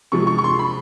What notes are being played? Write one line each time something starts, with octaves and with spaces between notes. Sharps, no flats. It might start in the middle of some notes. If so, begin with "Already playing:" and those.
C3 F3 G#3 C#6
C#6
C#6
C6
B5